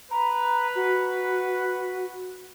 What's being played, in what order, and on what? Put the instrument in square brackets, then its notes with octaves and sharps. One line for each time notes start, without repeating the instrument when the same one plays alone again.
[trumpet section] B4 [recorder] A#5
[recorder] F#4